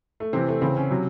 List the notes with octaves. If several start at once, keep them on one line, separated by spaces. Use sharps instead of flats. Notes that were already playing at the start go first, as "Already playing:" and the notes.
A3
C3 E3 C4
A3
C#3 E3 C4
C#4
C3 F#3